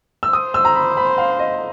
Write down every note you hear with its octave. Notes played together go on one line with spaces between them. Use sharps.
E6
C5 D#6
E6
A#5
B5
B5
F5
D#5